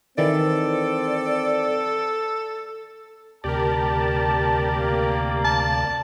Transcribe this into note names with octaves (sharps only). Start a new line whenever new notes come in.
D#3 E3 C4 A4 D5
D2 C3 G4 A#4 D5 A5
A#3
A5